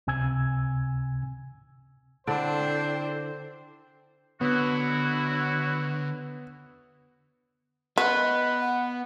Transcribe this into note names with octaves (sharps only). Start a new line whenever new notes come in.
C#2 C3 G#5 E6 G#6
D3 C4 D4 E4 A4 C5 G5
D3 F#3 B3 E4 F#4
B3 F#4 B4 D#5
F#5